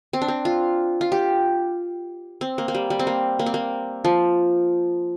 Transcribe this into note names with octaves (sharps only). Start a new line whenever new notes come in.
C4
D4
C4
F4
F4
G4
C4
A#3
A#3
G3
G3
C4
A#3
A#3
C4
A#3
F3